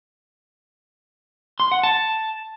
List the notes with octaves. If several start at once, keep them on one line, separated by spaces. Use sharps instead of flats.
C6
F#5
A5